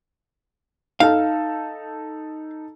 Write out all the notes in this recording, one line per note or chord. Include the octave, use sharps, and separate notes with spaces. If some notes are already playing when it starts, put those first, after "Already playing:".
D#4 A4 F5 A5